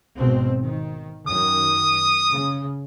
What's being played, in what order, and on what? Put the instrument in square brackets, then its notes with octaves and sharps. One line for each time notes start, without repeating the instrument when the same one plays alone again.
[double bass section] G#1 B2 C4
D#3
[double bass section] F#2 D#3 [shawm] D#6
[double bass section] C#3